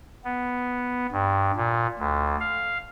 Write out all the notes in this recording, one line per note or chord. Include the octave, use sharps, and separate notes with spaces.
B3
G2
A#2
D2
F5